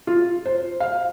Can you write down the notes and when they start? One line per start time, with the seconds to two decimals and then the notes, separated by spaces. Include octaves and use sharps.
0.07 F4
0.46 C5
0.80 F5